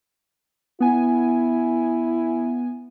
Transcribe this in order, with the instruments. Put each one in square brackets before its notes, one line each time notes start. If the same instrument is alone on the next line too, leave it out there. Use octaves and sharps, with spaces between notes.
[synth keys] B3 G#5 [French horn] E4